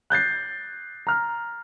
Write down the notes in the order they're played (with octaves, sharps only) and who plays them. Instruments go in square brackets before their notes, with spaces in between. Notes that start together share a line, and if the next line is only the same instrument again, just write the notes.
[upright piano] F#6 G6 A6 C7
A#5 F6